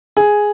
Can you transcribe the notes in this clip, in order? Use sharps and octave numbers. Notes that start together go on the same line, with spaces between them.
G#4